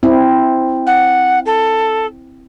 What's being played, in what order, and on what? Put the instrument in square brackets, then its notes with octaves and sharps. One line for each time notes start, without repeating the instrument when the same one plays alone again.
[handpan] C4 E4
[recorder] F#5
A4